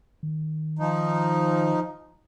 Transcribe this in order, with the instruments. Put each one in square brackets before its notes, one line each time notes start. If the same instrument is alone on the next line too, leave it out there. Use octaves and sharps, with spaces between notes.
[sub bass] D#3
[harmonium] F3 D#4